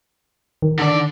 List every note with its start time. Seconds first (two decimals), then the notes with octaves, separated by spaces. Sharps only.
0.62 D#3
0.79 D3 D5